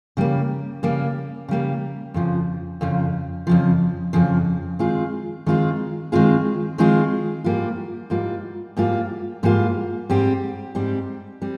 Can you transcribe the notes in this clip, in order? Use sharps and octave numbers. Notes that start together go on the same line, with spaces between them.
C#3 G3 A#3
C#3 G3 A#3
C#3 G3 A#3
F2 C#3 F3
F2 C#3 F3
F2 C#3 F3
F2 C#3 F3
D#3 G#3 C4 F4 G#4
D#3 G#3 C4 F4 G#4
D#3 G#3 C4 F4 G#4
D#3 G#3 C4 F4 G#4
G#2 G3 A#3 F4
G#2 G3 A#3 F4
G#2 G3 A#3 F4
G#2 G3 A#3 F4
G#2 G3 C4 G4
G#2 G3 C4 G4
G3 C4